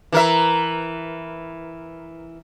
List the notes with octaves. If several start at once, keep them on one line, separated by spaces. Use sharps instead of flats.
E3 A#4 E5